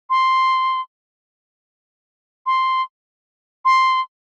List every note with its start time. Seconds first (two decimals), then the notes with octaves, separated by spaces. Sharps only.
0.10 C6
2.46 C6
3.65 C6